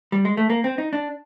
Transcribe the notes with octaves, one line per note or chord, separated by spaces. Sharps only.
G3
G#3
A3
A#3
C4
D#4
D4